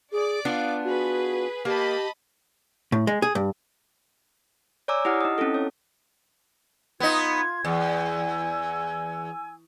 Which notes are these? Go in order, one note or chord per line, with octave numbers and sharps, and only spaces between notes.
G#4 D5 D6
B3 D4 F4 F5
F#4 G#4 B4
A#3 G4 D#5 A5 B5
A2
G#3
G#4
G2
C#5 D5 G#5 A#5 D6 E6
E4 G4 F#5 D#6 F6
D#4 D#5 D#6
C4 C#4 D#4 E4 A4
C#5
B3 D#4 F4 G#6
E2 G#5 E6